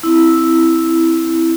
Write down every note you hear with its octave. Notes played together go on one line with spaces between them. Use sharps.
C4 E4